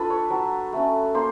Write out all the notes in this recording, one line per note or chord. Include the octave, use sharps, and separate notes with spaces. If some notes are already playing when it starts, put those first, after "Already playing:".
Already playing: D4 F4 A4 B4 B5
C#5 C#6
F#3
A3 C#4
A#3 C5 C6